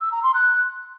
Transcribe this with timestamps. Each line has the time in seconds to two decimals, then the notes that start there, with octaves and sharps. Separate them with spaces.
0.01 E6
0.12 A#5
0.23 C6
0.34 F#6